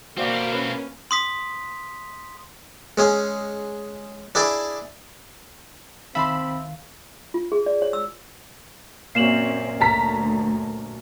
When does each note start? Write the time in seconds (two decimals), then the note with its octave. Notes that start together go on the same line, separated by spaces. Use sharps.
0.17 B2 A#3 C4 F#4 C5 D5 F5
0.53 C#4 B4
1.11 C6 D#6 B6
2.98 G#3 C#4 G#4
4.35 D4 E4 G#4 D5
6.15 C2 D#3 C4 E5 F5 A5 B5 C6
7.34 F4
7.52 G#4
7.66 D5
7.82 C#5
7.93 E6
9.15 F#2 A#2 C4 C#4 C7 E7 F#7
9.81 D2 A5 A#5 B6